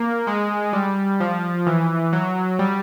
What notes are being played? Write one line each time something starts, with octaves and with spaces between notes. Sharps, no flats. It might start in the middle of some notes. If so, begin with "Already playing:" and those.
Already playing: A#3
G#3
G3
F3
E3
F#3
G3